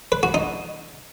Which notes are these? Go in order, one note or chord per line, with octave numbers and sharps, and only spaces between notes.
B4
F#4
D#4